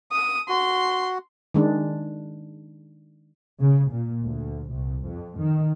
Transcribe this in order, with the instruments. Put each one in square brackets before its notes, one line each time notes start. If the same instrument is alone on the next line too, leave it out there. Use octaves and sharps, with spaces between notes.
[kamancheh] D#6
[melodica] F#4 [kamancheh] C6
[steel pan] D#3 G#3 D4
[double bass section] C#3
A#2
D2
C2
F2
D#3